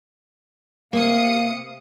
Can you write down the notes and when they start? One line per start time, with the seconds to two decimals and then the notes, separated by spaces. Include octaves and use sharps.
0.93 C3 A#3 F5 D#6 C#7